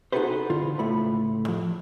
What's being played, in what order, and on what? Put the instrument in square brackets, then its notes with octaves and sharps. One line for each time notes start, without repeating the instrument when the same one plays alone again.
[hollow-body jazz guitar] D#4 F#4 G#4 A4 B4 C5
D3 E4 F4
C#2 A2 A3 B5
F3